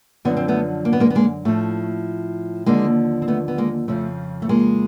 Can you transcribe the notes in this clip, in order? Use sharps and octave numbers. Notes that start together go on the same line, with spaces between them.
F#2 D3 F3 B3
C4
A3 B3
A#3
B3
G#3 A#3
B3
G#3 A#3
A2 F3 A3
D#2 D3 F3 G#3 A#3
C4
A3 B3
B3
G#3 A#3
F2 C#3 F3 A3
A3
G#3 A#3